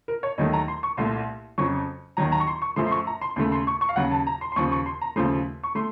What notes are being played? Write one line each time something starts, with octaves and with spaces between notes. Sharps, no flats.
A#4
C#5
D#2 D#3 F#3 A3 D#5
A#5
C6
C#6
C2 A#2 A3 C6
F2 C#3 F#3 C#6
D#2 D#3 F#3 A#5
A#5
C#6
C6
C#6
F#2 F3 A3 C6
C6
C#6
A#5
C6
D#2 C#3 A3 C6
C6
C#6
C#6
F5
D#2 C#3 F#3 F#5
A5
A#5
C6
C6
D#2 C#3 F3 C#6
C#6
C6
A#5
D#2 C#3 F3 A3 C6
C#6
A3 C6